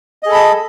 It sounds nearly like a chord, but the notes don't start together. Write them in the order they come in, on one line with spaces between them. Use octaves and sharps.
D#5 G#4 A4 B5 A5